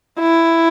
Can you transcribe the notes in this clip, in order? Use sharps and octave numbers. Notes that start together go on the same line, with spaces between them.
E4